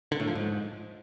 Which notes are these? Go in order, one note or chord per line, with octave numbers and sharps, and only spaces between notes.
D3
A2
F3
G#2